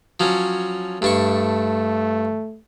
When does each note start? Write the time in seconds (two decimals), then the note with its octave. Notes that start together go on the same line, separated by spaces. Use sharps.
0.20 F3 F#3 C#4
1.02 G2 A3 D4 C#6